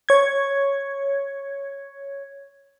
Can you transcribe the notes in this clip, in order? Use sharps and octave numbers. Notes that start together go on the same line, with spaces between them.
C#5 G#6